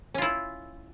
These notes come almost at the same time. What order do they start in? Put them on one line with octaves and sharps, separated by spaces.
C#4 F4 E4